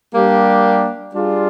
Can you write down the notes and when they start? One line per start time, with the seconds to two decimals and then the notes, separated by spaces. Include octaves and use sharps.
0.14 G3 A#3 D4 G4
1.12 G3 D4 F4 G#4